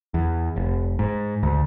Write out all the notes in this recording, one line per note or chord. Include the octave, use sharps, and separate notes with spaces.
E2
F1
G#2
D2